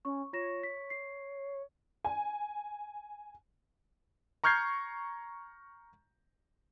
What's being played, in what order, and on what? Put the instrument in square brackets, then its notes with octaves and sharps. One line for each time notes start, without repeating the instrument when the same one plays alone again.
[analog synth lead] C#4 [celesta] C#6
[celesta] F4 A#6 E7 [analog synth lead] C#5
[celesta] B6
C7
[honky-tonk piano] G#5
[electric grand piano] A#5 C#6 F6 G6 G#6 C7